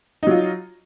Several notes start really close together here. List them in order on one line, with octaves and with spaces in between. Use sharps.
D#4 F#3 F4